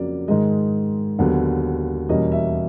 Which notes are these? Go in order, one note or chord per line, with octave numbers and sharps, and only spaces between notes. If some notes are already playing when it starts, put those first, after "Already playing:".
Already playing: F2 C#3 F#3 A#3 D5
G#2 D#3 G#3 D#5
D#2 D3 F#3 B3
E2 B2 G3 A#3 C#4 D#5
E5